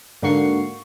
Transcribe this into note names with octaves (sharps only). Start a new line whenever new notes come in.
G#2 D3 A#3 F#4 C#6 C7